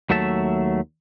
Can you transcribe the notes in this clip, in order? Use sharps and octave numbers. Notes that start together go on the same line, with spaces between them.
D#2 F#3 A3 E5 A5